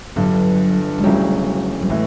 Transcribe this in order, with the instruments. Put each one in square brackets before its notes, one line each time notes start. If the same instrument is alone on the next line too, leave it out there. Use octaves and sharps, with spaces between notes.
[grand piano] G1 G2 D3 [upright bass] F#3
[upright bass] G#3
[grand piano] E1 D2 C#3 F#3 [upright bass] G3
[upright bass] G3
[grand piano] A2 E3 [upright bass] G#3